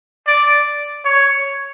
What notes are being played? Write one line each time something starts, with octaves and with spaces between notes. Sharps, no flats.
D5
C#5